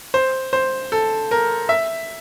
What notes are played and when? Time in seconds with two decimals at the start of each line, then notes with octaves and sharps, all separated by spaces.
0.14 C5
0.53 C5
0.92 A4
1.31 A#4
1.69 E5